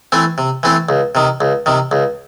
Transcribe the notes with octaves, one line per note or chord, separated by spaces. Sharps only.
E3 A3 C4
C3
E3 A3 C4
C#2
C3 D#3
C#2
C3 D#3
C#2